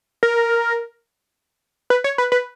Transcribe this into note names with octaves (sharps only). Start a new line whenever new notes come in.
A#4
B4
C#5
B4
B4